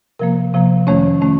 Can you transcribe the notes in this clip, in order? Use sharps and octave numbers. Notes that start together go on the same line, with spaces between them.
C3 F3 A#3 A#4
C3 F3 A#3
F2 D#3 A3 C#4 C#5
D#3 A3 C#4